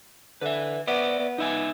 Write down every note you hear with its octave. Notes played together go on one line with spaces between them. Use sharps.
D3 B4 E5
B3 D5 E5
B3
D#4 E5 G#5